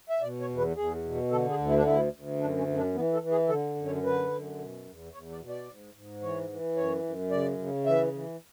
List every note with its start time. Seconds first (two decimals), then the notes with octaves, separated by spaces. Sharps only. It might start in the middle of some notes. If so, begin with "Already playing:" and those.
0.10 E5
0.21 B2 D5
0.40 C#5
0.50 E2
0.57 B4
0.76 E2 G#4
1.04 B2
1.31 D3 A4
1.50 G#4
1.58 D2
1.67 E4
1.76 D4
1.83 D2 E4
2.13 D2
2.40 F#2 D4
2.58 C#4
2.67 F#2
2.76 D4
2.95 E3 B3
3.13 A4
3.21 E3
3.31 G#4
3.48 D3 A4
3.76 F#2
3.86 C#5
4.03 D3 B4
4.31 F#2
4.58 B2
4.85 E2
5.13 E2 C#5
5.31 D5
5.40 B2
5.49 D5
5.68 G#2
5.94 G#2
6.22 E3 C#5
6.49 E3
6.76 F#2 C#5
7.03 F#2
7.30 C#3 D5
7.58 C#3
7.86 E3 E5
8.13 E3